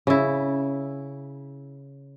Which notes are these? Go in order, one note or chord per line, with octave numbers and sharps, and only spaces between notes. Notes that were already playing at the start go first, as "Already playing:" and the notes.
C#3 E4